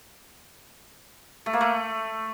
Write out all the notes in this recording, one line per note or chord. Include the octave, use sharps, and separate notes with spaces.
A3
A#3
A3